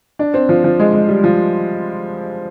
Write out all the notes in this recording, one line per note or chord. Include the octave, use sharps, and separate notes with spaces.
D4
C4
F3
F3
G#3
G#3
G3
F3